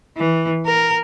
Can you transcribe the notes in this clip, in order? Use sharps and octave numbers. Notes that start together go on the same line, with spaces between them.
E3
A#4